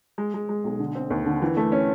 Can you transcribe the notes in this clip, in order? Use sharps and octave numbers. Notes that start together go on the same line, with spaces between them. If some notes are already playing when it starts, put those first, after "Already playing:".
G#3
G#3
G#3
B1
D3
C4
D#2
D3
E3
A3
C#4